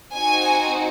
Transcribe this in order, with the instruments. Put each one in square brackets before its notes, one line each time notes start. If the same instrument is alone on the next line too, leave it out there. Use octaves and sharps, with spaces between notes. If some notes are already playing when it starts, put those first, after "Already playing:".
[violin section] C4 D#4 F#4 G#5